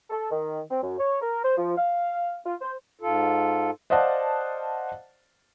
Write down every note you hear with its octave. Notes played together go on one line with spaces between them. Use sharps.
A4
D#3
C4
F#2
C#5
A#4
C5
F3
F5
F4
C5
G#2 F4 A4
C5 D5 D#5 F5 F#5 A5